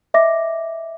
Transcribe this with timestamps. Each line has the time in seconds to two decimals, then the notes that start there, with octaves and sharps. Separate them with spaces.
0.14 D#5 E5 D6 A#6